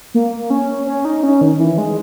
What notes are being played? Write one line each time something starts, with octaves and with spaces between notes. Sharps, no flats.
A#3
C#4
C#4
D#4
C#4
D#3
E3
G#3